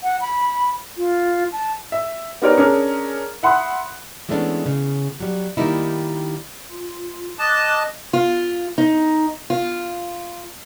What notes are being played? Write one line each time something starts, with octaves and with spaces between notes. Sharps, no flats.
F#5
B5
F4
A5
E5
B3 D#4 G4 A#4 C#5 D5
C#4 D4 G#4 A#4
E5 F#5 B5 C6 D#6 F#6
E3 G#3 A3 B3 C#4 D4
C#3
F#3 G3
D#3 G3 A#3 D#4 E4
F4
D#5 A5 D6 F#6
F4
D#4
F4